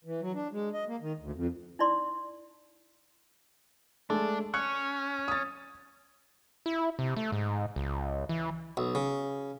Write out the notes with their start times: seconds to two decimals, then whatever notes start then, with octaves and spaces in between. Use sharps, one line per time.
0.04 E3
0.21 F#3
0.34 D4
0.52 G#3
0.73 D#5
0.88 A#3
1.01 D#3
1.20 D2
1.35 F2
1.79 D#4 E4 D5 C6
4.10 G#3 A3 D4
4.54 C#4 F#6 C#7
5.28 D#6 A6
6.66 E4
6.99 C3
7.17 A3
7.32 G#2
7.76 C#2
8.29 E3
8.77 B1
8.95 C#3